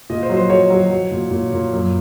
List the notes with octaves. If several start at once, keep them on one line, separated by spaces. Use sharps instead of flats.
A#2 D#5
C5
F#3
C5
F#3 C#5
F#3
F#3
A#2
A#2
A#2
F#2